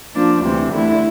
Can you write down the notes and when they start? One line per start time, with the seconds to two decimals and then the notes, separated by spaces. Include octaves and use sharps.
0.14 F3 A#3 D4
0.42 D2 C3 E3
0.72 D3 A3 E4